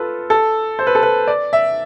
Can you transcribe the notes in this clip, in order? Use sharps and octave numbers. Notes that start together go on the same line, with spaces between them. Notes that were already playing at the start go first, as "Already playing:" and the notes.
Already playing: F4 A4 B4
A4
C5
B4
A4
B4
D5
E5